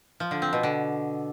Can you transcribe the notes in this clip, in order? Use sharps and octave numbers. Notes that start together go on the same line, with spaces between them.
F3
D3
C4
B2
D3